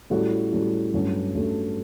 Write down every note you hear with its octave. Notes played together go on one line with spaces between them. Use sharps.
A2 G3 C#4 F#4 A4
A2 G3 C#4 F#4 A4
G2 F#3 A3 C#4
G2 F#3 A3 C#4